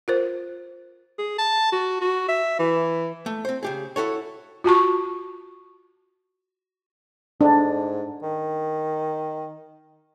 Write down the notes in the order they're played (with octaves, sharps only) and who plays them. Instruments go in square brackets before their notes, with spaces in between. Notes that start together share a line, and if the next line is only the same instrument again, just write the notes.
[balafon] F4 A#4 C5
[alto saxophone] G#4
A5
F#4
F#4
E5
E3
[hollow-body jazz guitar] A3
C4 C5
C#3 G4 G#4
E4 F#4 A4 C#5
[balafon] F4 F#4 A5 C#6
[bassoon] G#2 [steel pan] D4
[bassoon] D#3